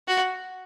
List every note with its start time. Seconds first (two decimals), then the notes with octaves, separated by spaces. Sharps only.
0.08 F#4